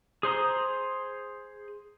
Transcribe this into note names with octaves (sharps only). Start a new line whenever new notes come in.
G#4 C5 A#5 D#6